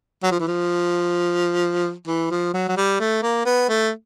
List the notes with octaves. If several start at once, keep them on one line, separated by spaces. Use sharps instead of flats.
F#3
F3
E3
F3
E3
F3
F#3
F#3
G3
A3
A#3
B3
A3